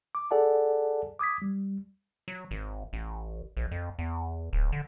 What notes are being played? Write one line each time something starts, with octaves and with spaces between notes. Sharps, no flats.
D6
G#4 A4 D5 F#5 G#5 A5
D6 D#6 G#6 B6
G3
F#3
G#1
A1
A#1
F2
E2
D1
D3